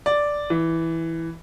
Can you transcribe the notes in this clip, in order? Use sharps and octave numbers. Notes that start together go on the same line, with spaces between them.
D5
E3